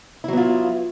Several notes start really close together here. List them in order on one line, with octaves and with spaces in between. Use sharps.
E4 F#3 B3 F4